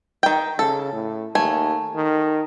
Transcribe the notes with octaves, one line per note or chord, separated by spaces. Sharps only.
D#3 G5
C#3 A4
A2
D#2 A3 G#5
D#3